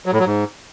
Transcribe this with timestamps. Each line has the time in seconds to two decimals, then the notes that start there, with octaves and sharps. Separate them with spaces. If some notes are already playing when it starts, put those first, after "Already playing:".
0.06 F#3
0.13 A2
0.19 F#3
0.26 G#2